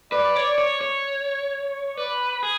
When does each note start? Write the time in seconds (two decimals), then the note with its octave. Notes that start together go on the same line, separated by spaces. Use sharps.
0.12 B4 D5
0.36 C#5
0.58 C#5
0.81 C#5
1.97 B4 D5
2.43 G#4